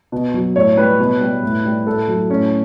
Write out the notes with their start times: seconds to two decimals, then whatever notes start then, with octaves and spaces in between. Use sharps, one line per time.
0.12 B2
0.34 F#3
0.56 A2 C#5
0.77 G3 B4
1.00 B2
1.21 G3
1.43 A2
1.65 G3
1.87 A2 A4
2.08 F#3
2.30 A2 C#4